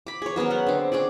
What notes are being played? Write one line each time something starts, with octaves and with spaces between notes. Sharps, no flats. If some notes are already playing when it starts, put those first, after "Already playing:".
B5 D6
G#4 C#5
F#3 B3 C#4 A#4
B3 F#5
D3 C4
C#4 D4 G#4 D5